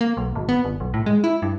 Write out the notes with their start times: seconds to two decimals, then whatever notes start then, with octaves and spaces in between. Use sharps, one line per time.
0.01 A#3
0.17 B1
0.36 G#1
0.49 B3
0.65 G1
0.80 B1
0.94 A2
1.06 G#3
1.24 E4
1.42 G2